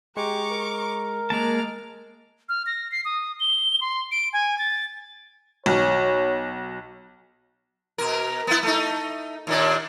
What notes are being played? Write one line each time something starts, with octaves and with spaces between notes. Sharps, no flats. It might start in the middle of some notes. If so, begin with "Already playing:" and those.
G#3 G4 A#5 C#6 D6
A#4
G#3 A#3 A5 D6 F6
F6
A#6
C7
D#6
G7
C6
D7
G#5
A6
B1 C#5
B2 A#4
B3 E4
A3 D#4
D#2 A#2 D4